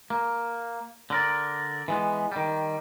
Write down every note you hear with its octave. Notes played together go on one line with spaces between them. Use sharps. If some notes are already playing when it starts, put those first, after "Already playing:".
A#3
D3 A#4 D5
E3 G#3 B3
D#3 G3